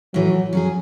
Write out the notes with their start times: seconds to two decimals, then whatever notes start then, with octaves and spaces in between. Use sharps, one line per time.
0.14 A2 E3 F#3 A3
0.53 F#3 C#4 G#4